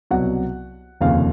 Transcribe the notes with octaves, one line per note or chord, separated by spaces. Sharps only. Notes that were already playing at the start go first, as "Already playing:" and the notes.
C2 B2 F#3 F#5
F1 D#2 C#3 F3 F5